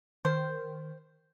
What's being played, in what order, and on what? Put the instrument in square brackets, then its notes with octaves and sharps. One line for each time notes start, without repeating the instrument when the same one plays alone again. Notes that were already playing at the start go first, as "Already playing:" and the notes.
[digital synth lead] D#3 [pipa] C5